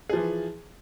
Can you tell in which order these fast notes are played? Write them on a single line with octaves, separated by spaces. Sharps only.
G#4 F3 E3